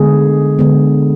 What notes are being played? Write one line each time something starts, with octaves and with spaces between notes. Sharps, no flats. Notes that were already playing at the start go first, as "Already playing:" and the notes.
Already playing: D3 G#3 B3 G#4
D3 G#3 B3